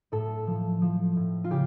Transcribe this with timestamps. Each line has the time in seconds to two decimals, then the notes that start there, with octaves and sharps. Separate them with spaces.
0.12 A2 A4
0.47 F3
0.82 F3
1.16 A2
1.44 F4
1.50 C#3 G4